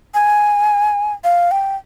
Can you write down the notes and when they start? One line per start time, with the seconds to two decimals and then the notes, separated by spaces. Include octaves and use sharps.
0.14 G#5
1.24 F5
1.51 G5